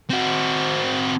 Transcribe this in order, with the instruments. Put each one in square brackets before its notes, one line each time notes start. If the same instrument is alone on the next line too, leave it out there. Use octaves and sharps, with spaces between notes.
[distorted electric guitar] C4 F#4